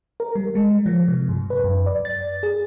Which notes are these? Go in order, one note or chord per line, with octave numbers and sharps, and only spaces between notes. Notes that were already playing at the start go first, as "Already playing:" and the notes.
A#4
G3
G#3
F3
C3
G2
B4
F#2
D5
A6
G#4